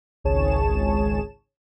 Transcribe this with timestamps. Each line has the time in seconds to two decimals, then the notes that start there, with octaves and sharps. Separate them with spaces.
0.24 G#1 C#2 G#4 C#5 A5 E7